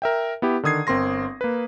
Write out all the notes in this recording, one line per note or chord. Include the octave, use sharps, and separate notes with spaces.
A#4 E5 G5
B3 E4 G4
D3 D#3 D#6 G#6 C7
G1 C4 A#4 C6 A#6
A#3 B4